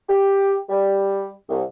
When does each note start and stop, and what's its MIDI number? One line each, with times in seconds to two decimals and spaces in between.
0.09 0.56 67
0.70 1.30 55
1.49 1.63 36